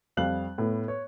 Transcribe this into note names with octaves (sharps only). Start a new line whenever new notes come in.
F2 G3 F5 F#6 F#7
A2 B3
C#5